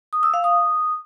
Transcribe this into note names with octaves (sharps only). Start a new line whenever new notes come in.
D#6
E6
F5
D#6